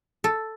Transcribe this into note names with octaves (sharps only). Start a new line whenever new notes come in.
A4